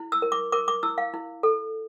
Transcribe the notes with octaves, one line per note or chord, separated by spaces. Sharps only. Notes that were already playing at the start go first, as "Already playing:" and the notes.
Already playing: E4
E6
A#4
D6
A#4 D6
D6
E4 E6
F5
E4
A4